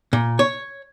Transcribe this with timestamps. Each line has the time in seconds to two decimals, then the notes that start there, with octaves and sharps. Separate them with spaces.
0.13 A#2
0.39 C#5